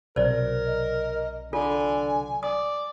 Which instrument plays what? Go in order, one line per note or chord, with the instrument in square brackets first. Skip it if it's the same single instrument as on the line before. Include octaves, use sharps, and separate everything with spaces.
[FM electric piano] B1 C3 F#3 [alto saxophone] A#4 [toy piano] C5 D5
[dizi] D#5
[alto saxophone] D3 [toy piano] F4 A4 [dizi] G#5
[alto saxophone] D5 [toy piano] D#6